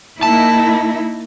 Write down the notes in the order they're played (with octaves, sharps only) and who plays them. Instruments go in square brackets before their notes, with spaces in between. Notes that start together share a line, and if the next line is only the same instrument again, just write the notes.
[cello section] A#3 D#4 E4 [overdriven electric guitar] A5